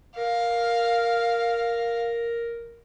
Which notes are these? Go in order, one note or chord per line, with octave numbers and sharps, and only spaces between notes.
A#4 F5